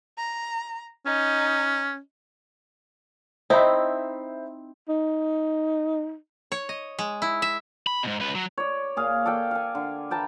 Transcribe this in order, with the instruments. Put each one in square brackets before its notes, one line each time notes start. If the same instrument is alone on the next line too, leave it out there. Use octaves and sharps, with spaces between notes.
[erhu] A#5
[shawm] C#4 [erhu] D#4
[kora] C4 D#4 E4 [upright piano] C5 E5 B5
[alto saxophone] D#4
[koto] C#5
D#5
G#3
E4
E5
[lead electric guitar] B5
G#2 B2
C#2 B4
F#3
[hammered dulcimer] C#5 D5
A#2 G#4 F5
A4 D5 F5 G5
F5 G#5
D3
B4 G5 A5 A#5